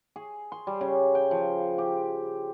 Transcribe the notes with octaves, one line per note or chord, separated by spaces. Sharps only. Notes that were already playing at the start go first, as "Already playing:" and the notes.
G#4
C6
G3
C#3
G5
F3
G4